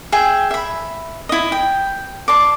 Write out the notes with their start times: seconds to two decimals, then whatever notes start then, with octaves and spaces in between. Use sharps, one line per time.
0.12 G#4 E5 G5
0.51 E5 B5
1.29 E4 D#5
1.52 G5
2.28 D5 A5 C6